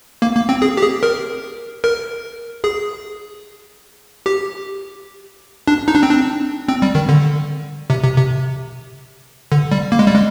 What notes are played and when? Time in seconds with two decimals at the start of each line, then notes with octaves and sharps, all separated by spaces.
0.22 A#3
0.35 A#3
0.49 C4
0.62 G#4
0.77 G4
0.82 G#4
1.03 A#4
1.84 A#4
2.64 G#4
4.26 G4
5.67 D4
5.88 D#4
5.95 D4
6.03 C4
6.10 D4
6.68 C4
6.82 G3
6.95 D#3
7.09 D3
7.90 C3
8.03 C3
8.17 C3
9.52 D3
9.72 G3
9.92 A#3
9.99 G#3
10.07 G3
10.14 G#3